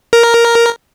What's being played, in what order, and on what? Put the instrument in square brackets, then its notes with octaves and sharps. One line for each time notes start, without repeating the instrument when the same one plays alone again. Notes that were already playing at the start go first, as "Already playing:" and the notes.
[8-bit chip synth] A#4